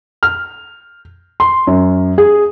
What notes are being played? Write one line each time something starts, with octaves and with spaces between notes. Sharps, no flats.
F6
C6
F#2
G#4